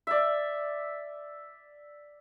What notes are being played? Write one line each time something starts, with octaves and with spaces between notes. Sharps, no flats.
D5 E5